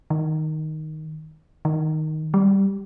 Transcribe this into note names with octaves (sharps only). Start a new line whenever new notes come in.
D#3
D#3
G3